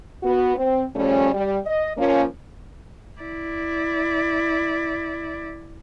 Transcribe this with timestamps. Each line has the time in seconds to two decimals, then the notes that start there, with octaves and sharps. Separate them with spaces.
0.23 B3 F#4
0.56 C4
0.96 C#3 F3 G3 A3 C#4
1.33 G3
1.65 D#5
1.98 F3 A#3 C#4
3.21 E4 D5